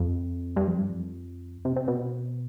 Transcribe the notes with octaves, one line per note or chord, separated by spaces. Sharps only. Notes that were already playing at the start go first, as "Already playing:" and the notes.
Already playing: F2
G2
F2
G2
F2
C3
C3
B2